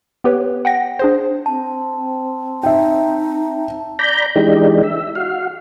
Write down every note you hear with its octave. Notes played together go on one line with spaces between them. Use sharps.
B3 G4 B4 C#5
F#5 G5 A#6
D4 G#4 C5
C4 A5
D#4 E5 G5
D5 A#5 B5 G6
E3 G#3 D4 D#4 G4
E5
F#4 F5